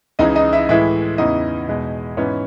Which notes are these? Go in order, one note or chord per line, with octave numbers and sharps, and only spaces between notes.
C#2 C#3 E3 G#3 D#4 D#5
D#4 D#5
E4 E5
A2 E3 G#3 E4 E5
E2 C#3 E3 D#4 D#5
E2 B2 G#3
G#2 E3 B3 C#4 C#5